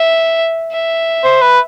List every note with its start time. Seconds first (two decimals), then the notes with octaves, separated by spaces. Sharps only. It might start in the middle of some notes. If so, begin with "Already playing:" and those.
Already playing: E5
0.72 E5
1.24 C5
1.42 B4